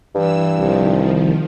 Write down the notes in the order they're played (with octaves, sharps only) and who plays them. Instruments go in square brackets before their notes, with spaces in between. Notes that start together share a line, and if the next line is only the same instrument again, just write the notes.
[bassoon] G2 [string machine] E3 E6
[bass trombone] C2 [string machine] D#3 F3